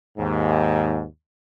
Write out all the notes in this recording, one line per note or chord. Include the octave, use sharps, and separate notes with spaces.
D#2 G#2